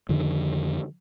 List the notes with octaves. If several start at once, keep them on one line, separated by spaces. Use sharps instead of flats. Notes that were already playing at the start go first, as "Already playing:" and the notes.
F2 D3 D#3